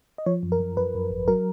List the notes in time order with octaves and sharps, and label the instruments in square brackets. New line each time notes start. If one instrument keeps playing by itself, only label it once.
[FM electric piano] D#5
F3 C#5
F#2
A#4
F#2
F#2 B4
F#2
G#1
F#3 A#4